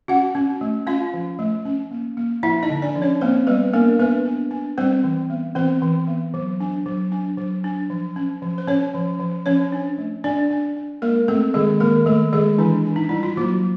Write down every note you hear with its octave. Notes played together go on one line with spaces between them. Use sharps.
C#4 F#4 F#5
C#4
A3
C#4 F4 F5
F3
A3
C#4
A#3
A#3
F3 E4 E5
D#4 D#5
D3
D4 D5
F3
C#4 C#5
A#3 C4 C5
G3 B3 B4
A#3 D4 A#4
B3 D4 B4
D4
D4
G3 C4 C5
E3
B3
E3 C4 C5
E3
B3
F#3
D4
F#3
D4
F#3
D4
F3
C#4
F3
C5
C#4 C#5
F3
F3
F3 C#4 C#5
D4
A3
D4 D5
D4
D4
G#3 A#3 A#4
A3 C4 A4
D#3 G#3 G#4
D#3 A#3 A#4
D#3 A3 A4
D#3 G#3 G#4
E3 D4 E4
D4
D#4
G3 E4
F4
F#3 A#3 F#4